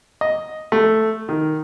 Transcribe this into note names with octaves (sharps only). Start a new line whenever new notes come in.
D#5
A3
D#3